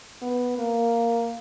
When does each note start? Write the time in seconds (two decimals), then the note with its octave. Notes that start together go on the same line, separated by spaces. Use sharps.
0.22 B3
0.58 A#3